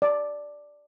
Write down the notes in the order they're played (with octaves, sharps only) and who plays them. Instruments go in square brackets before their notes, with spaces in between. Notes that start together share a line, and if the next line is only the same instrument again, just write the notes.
[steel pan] D5